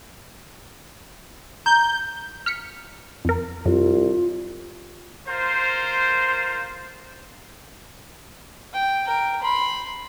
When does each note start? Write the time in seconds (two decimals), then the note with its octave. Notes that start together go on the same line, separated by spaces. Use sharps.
1.66 A#5 G6
2.46 F6 B6 C#7
3.25 F2 A#4
3.66 C2 F#2 F4
5.28 F4 A#4 C5
8.73 G5
9.07 A#4 G5
9.42 B5 C6